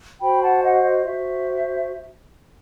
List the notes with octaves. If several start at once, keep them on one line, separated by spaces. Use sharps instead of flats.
F#4 C5 G5 B5
F#5 A5
D#5 F#5
D#5
F#4 C5 E5